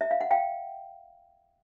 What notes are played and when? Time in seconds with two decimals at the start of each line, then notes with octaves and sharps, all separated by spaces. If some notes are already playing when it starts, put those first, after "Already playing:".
0.01 E5
0.11 F5
0.21 F#5
0.31 F5 G5